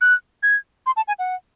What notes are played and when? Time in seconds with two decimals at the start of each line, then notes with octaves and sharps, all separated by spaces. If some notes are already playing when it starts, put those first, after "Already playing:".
0.01 F#6
0.43 G#6
0.86 C6
0.96 A5
1.08 G#5
1.19 F#5